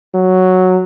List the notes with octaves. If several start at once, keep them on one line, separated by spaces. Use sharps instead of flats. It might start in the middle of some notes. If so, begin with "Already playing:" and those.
F#3